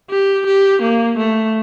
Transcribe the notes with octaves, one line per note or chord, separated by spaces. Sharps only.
G4
G4
A#3
A3